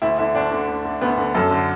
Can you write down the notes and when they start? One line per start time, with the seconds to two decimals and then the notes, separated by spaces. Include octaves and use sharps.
0.02 D2 E4
0.18 D3 E4
0.35 D2 D4
0.52 D3
0.68 D2
0.85 D3
1.01 D2 B3
1.18 D3
1.34 F#2 A4
1.51 D3